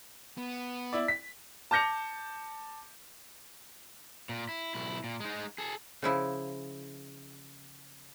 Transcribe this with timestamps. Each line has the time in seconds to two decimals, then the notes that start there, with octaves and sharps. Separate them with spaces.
0.38 B3
0.93 E4 D5
1.08 B6
1.71 A5 D6 G6 A#6 C#7 F7
4.29 A#2
4.49 E4
4.74 B1 E4
5.04 A#2
5.20 G#3 D#4
5.58 G#4 A4
6.02 C#3 F3 E4